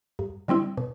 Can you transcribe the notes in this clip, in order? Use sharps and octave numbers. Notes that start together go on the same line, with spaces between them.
G2
D3 G3 C4 E4
B2